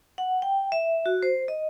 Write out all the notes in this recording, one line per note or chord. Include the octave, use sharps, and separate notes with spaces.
F#5
G5
E5
F#4
C5
D#5